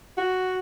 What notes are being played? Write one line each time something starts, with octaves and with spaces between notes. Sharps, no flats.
F#4